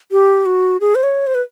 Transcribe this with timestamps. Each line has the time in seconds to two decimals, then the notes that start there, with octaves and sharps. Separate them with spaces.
0.11 G4
0.46 F#4
0.80 G#4
0.95 C5
1.03 C#5
1.27 C5
1.35 B4